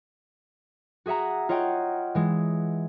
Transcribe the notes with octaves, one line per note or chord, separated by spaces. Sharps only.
F#4 G#4 E5 F#5 A#5
F4 C#5 D#5 F#5 G5
E3 G#3